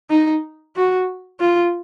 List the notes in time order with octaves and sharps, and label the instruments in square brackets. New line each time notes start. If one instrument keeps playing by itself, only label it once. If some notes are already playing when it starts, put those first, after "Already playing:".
[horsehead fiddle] D#4
F#4
F4